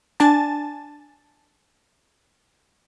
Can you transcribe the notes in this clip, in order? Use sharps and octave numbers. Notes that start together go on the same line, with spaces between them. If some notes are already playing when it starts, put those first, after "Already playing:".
D4 G#5 A5 A6